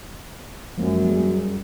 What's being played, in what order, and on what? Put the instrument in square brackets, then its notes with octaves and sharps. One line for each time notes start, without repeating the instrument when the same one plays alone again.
[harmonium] F#2 [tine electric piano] F3 G#3 A#3
[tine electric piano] G3 G#4